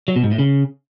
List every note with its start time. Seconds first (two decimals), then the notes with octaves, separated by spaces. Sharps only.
0.08 F#3
0.16 B2
0.23 G#2
0.31 A2
0.39 C#3